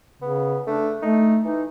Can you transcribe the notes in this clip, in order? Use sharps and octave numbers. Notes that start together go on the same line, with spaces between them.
C#3 B3
A3 D4
A3 D#4
E3 D#4